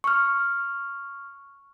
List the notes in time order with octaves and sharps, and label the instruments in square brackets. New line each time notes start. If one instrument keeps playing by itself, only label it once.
[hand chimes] C#6 F6